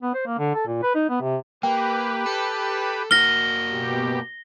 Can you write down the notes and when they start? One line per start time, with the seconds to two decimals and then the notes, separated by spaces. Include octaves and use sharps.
0.03 B3
0.14 C5
0.26 A#3
0.38 D3
0.54 A4
0.67 A#2
0.83 B4
0.95 D#4
1.09 B3
1.21 C3
1.63 A#3 G4 B4 G5
2.26 A4
3.11 A#3 F#4 F6 A#6 G7
3.70 B2 G4